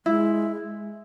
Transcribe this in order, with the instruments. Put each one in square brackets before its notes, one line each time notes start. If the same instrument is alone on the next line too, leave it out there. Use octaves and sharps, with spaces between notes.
[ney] G#3 [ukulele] E4